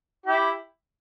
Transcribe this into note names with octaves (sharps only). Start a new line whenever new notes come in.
E4 G4